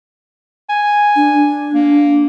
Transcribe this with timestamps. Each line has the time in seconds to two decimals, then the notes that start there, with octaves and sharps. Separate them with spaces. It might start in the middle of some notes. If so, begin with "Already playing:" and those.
0.70 G#5
1.16 D4
1.74 A#3